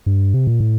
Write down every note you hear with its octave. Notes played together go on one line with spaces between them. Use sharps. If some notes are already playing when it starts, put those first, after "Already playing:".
G2
C3
A#2
A2